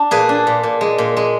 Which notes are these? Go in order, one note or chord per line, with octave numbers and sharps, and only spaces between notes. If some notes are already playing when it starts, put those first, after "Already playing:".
Already playing: D4
A#2 G#4 B4
D4
A#2
A#2
G#3
A#2
G#3